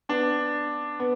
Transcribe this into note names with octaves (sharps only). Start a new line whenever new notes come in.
B3 D4
B3